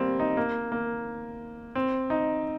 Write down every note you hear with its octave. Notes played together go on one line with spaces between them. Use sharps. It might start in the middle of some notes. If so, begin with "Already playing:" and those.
Already playing: G3 A#3 C4
D#4
A#3
A#3
C4
D#4